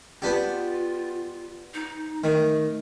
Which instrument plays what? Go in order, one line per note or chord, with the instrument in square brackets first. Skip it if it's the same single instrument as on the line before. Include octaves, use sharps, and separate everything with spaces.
[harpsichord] B3 D4 G4 [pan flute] F4
[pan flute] D#4
[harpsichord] D#3 [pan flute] A3